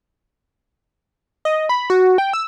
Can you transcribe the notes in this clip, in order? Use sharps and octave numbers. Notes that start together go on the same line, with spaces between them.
D#5
B5
F#4
G5
E6